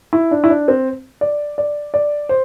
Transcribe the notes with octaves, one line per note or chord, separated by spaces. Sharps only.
E4
D4
E4
D4
C4
D5
D5
D5
C5